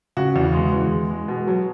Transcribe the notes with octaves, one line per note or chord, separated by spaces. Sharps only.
C#3 F#4
E2
G#3
E2
G#3
G#3
B2
F#3